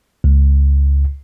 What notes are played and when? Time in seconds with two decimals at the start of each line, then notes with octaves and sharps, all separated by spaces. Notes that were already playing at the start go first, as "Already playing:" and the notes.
0.24 C#2